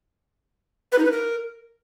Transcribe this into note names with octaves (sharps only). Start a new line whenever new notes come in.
B4
D#4
B4
A#4